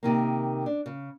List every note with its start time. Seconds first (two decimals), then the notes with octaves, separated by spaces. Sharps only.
0.03 C3 D#3 A#3
0.66 D4
0.86 C#3